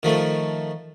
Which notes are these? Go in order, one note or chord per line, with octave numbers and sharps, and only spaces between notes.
D#3 F3 A3